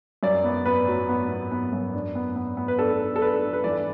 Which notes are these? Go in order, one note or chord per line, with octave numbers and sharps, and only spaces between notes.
F#2 D5
B3
B3 B4
F#3
B3
B3
B3
F#2
D4
B3
B3
B3
B4
D4 A4
D4
A4
D4 B4
D4
B4
E3 D5